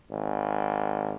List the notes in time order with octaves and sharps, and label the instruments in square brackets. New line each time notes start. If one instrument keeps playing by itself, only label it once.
[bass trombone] G#1